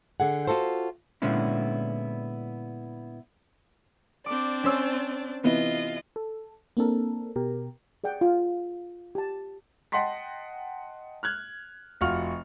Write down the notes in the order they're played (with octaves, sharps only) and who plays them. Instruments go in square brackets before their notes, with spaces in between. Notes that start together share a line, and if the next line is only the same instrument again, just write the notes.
[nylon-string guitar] D3 G#4 F#5
F4 F#4 A4 C5
[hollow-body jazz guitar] A#2 D3 G#3 B3 C#4 E4
[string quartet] C4 D4 D5 [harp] D6
[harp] C#4 C5 E6
[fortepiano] C3 E3 B3 [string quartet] F4 D#5
[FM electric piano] A4
A#3 C4 D4 A4 A#4
B2 G4 A#4
[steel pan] G#4 D5 F#5 G5
F4
G4 A5
[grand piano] D#5 F#5 G5 A5 C6 B6
F6 F#6 G#6
F1 F4 F#4 F#5 C#6 F6